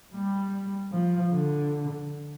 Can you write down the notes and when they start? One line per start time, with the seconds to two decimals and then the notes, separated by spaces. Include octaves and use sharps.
0.14 G3
0.92 F3
1.32 D3